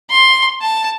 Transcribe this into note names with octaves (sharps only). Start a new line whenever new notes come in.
C6
A5